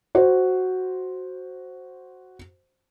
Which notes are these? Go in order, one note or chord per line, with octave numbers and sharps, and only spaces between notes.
F#4 C5